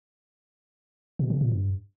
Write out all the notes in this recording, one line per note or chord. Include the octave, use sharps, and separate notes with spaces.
B2
C#3
A#2
G2